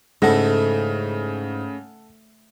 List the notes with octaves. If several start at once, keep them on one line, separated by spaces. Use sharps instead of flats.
G#2 C#3 A3 E4 A4 F#5 A#6